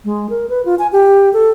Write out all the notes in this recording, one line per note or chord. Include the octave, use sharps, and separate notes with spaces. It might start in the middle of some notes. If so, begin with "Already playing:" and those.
G#3
A#4
B4
F4
G#5
G4
A4